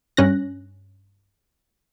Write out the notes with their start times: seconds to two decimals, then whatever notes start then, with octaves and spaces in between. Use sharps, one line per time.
0.17 G2 C#4 F#6 A#6